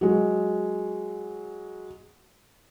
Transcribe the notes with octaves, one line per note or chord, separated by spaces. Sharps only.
F#3 G#3